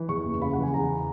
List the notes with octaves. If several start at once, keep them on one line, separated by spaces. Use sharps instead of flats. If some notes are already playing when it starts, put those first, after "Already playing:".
Already playing: E3
E2 C#6
F#1
C#3 B5
E3 F#5
G#5
E2 A#5